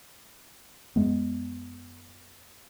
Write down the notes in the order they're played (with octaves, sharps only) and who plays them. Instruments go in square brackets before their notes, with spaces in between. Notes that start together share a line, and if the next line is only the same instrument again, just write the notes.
[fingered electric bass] F#2 G#3 B3